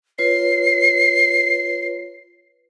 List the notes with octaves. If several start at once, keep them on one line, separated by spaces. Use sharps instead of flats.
F4 B4 C#5 C7